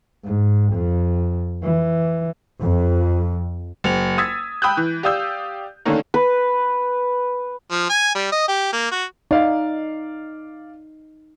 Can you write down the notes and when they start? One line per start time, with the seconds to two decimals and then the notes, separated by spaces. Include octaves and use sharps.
0.24 G#2
0.74 F2
1.63 E3
2.60 F2
3.84 F#1 F7
4.18 D#6 E6 G#6 A6 B6
4.62 G5 B5 D#6 E6 F#6 G6
4.77 E3
5.03 G4 D5 F5 D#6 E6 G6
5.85 D3 D#3 A3 A#3 C#4 D#4
6.14 B4
7.71 F3
7.89 G#5
8.15 G3
8.32 D#5
8.48 G4
8.73 A#3
8.91 F#4
9.31 D#4 D5 F5